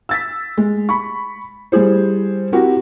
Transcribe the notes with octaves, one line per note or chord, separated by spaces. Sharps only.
E6 A6 B6
G#3
B5 C#6
G3 E4 G#4 C5
C4 E4 F#4 G4 A#4